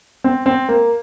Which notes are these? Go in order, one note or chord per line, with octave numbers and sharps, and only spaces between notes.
C4
C4
A#3